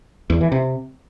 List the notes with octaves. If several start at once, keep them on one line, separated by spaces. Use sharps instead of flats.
E2
E3
C3